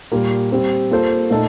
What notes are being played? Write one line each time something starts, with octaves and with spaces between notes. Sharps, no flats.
A#2 G3 A#3
G3 C4 G4
A#3 F4 A4 C5
A#2 A3 D#4 A4